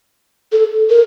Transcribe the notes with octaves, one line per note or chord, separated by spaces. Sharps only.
A4
A#4